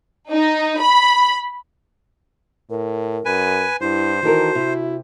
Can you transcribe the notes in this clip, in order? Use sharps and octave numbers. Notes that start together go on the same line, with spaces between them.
D#4
B5
A2 A#4
F#2 B4 G#5
G2 E4 C5
D#3 E3 F#4 A4 A#4
C3 E4